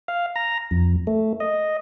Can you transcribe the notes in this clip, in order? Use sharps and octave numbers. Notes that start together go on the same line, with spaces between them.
F5
A#5
F2
A3
D#5